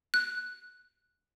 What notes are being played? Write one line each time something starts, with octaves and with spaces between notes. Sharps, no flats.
F#6